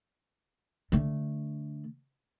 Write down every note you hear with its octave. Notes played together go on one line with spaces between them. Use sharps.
D3 A3